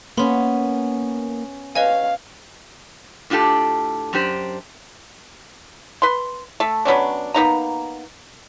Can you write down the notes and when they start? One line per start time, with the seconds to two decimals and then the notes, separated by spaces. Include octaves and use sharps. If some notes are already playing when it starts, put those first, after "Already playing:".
0.17 A#3 B3 C#4 B5 C6
1.75 B4 C#5 D#5 F5 G#5
3.30 A2 D4 F4 G4 A4
4.13 F#2 D4 G4 C5
6.02 B4 C6
6.60 A3
6.85 F#3 B3 C#4 D4
7.34 A#3 B3 D#4 A#5